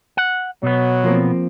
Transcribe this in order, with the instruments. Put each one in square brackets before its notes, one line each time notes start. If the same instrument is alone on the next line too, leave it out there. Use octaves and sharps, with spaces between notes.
[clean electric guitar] F#5
[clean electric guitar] B2 B3 [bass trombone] F#3
[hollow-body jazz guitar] F3 A#3 C4